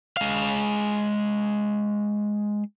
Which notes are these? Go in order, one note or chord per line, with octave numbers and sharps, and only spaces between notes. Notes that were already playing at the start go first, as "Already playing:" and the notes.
G#3 F5